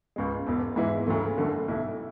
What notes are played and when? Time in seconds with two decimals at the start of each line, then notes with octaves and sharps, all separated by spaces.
0.16 C#2 C#3 G#3
0.46 E1 E2 B2
0.76 G#2 E3 G#3 B3 E4
1.07 D2 C#3 F#3 A3
1.38 F#1 F#2 D3 A3
1.68 B1 B2 A3 E4